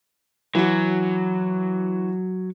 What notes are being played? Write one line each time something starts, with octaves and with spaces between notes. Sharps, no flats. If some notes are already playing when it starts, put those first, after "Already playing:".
E3 F#3 F#4